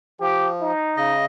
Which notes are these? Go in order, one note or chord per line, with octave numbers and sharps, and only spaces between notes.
F3 G4
D#4
C#3 D#5